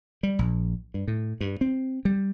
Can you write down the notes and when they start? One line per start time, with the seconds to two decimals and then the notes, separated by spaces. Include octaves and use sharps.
0.23 G3
0.39 A#1
0.94 G2
1.08 A2
1.41 G2
1.61 C4
2.05 G3